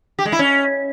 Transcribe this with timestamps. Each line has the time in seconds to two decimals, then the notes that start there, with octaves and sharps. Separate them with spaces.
0.19 G4
0.25 G#3
0.32 E4
0.39 C#4